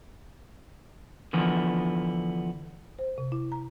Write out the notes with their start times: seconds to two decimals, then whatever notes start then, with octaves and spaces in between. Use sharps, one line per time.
1.33 D3 E3 F3 B3
2.99 C5
3.18 C3
3.32 E4
3.52 A#5